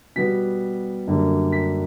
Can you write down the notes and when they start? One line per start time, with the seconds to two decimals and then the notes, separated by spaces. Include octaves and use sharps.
0.16 B2 G3 B3 B6
1.07 F#2 D3 G3 A#3
1.53 B6